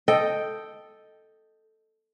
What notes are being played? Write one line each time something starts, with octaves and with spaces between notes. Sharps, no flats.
A4 D#5 G5